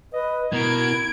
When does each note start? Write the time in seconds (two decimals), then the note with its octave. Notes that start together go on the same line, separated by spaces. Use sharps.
0.13 B4 D#5
0.53 B2 E4 A#4 G#6 D7